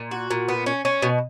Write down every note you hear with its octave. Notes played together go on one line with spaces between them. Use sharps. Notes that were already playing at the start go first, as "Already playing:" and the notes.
Already playing: A#2
F#4
A#2
B3
C#4
C#4
B2